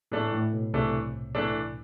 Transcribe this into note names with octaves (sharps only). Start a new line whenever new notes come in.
A2 E3 A3 D4
A2
B2
C2 C3 E3 A3 D4
E3 A3 D4